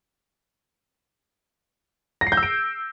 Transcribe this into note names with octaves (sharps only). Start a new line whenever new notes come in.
A#6
C7
G6
E6
D7